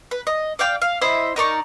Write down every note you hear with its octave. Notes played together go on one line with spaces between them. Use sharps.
B4
D#5
D5 F5 G5 D6
F5
E4 C5 D#5 E5
D#4 A#4 D5 C#6